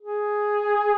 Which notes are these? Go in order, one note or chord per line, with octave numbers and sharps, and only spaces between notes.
G#4